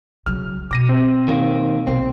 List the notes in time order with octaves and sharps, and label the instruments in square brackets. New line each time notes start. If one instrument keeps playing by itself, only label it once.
[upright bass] C#3 F#3 [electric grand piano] F6
[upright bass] B2 [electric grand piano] D6 A#6 D#7
[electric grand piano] C4
[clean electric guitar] D#3 A#3
[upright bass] B1 C3 [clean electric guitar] C4